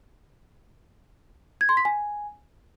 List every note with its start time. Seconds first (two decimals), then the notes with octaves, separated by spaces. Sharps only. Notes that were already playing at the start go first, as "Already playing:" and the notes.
1.61 G#6
1.69 C6
1.77 B6
1.85 G#5